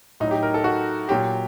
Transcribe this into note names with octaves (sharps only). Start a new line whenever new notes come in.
A2 F#3 D#4
G4
A#4
A4
F#4
A#2 F#3 G4